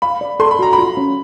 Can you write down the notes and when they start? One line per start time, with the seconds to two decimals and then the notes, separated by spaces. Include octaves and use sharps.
0.02 F5 B5
0.21 D5
0.40 A4 C6
0.51 B5
0.59 F#4 A#5
0.73 B5
0.78 F4
0.97 C#4